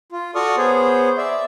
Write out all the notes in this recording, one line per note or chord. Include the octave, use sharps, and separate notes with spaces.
F4
F#4 A4 D5 C#6 D#6 F6
B3 G#4 C5 C#5
D5 E5